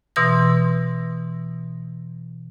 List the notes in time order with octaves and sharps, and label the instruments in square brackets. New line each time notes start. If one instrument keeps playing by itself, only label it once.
[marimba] B2 E3 C6 E6 A#6